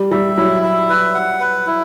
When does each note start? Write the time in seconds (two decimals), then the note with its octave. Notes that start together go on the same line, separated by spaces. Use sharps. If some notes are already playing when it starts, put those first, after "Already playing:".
Already playing: G3
0.12 G3 E5
0.37 F#3 E4
0.63 E5
0.89 B4
1.15 F#5
1.40 B4
1.66 E4